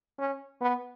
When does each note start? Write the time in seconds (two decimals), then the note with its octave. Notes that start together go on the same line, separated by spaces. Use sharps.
0.19 C#4
0.61 B3